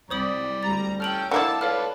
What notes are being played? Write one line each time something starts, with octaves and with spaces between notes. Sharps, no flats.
C2 C5 D5 B5 D#6 F#7
D2 G3 A#5 A6
C#4 A4 G5 F6 F7 F#7
D3 A#3 E4 A4 F5 F#5 A5 D6
F4 A4 B4 C#5 D5 F5 F6